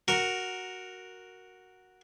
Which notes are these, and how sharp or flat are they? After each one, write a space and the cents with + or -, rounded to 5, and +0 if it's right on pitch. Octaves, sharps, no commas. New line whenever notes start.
F#4 +0 A#4 +0